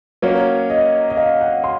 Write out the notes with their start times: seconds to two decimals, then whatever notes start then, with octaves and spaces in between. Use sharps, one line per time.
0.22 F#3 A#3 C#4 C#5
0.70 D#5
1.10 D#5
1.17 F5
1.41 F#5
1.64 C6